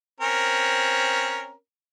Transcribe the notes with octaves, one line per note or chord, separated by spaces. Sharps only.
C4 C#4 A#4